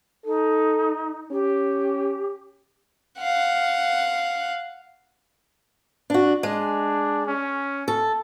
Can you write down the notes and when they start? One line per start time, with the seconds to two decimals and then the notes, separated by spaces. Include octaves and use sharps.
0.25 D#4 A4
1.31 C#4 G4
3.18 F5 F#5
6.10 D4 F#4
6.43 G#3 D4
7.26 C#4
7.88 A4